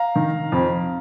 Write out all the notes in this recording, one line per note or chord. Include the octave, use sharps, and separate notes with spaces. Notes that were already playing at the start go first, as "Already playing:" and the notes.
Already playing: F5 A#5
D#3
F2